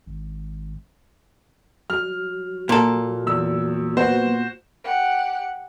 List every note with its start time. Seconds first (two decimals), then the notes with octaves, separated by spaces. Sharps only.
0.06 G#1
1.90 F#3 F6
2.69 A#2 A4
3.27 E2 E6
3.97 A#3 B3 F#4 C5
4.84 G4 F#5